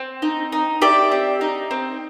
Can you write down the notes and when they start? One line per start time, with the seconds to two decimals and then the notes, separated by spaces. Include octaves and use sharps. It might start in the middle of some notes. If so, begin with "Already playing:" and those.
Already playing: C4
0.22 D#4
0.52 D#4
0.82 G4 D5 E5
1.11 C4
1.41 D#4
1.71 C4